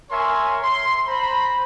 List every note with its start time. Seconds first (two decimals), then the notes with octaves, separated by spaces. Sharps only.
0.11 A#4 C#5 E5 G#5 C6
0.63 C6
1.07 C5 A#5 B5